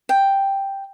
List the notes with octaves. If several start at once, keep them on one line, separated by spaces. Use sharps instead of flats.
G5